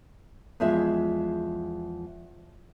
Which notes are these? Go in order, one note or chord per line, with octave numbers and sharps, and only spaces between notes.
E2 F3 G#3 G#4 E5